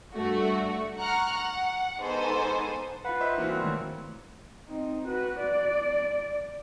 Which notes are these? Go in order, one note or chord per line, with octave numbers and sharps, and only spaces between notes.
G2 A3 D4 F#4
F#5 A#5 C#6 F6 F#6
F#5
G#2 B3 A4 C5 G#5
F4 B4 F5 F#5
C5 D#5 E5
E3 A#3 F#4
G3 C4
D#3 A3 C#5
C4 D#4
F#4 B4
D5